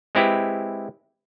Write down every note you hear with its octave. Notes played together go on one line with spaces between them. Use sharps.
G#3 C4 E4 G4 B4